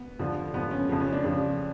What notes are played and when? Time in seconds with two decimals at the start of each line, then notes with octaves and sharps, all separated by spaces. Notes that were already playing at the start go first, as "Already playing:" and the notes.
Already playing: B3
0.19 F2 D3 F3
0.54 F2 D3 F3 B3
0.71 C#4
0.89 F2 C#3 F3 B3
1.00 C#4
1.13 D4
1.24 F2 C#3 F3